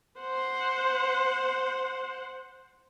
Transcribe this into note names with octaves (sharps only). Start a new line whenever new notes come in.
C5 F#5